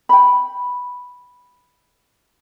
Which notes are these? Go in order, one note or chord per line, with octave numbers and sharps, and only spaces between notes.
G5 B5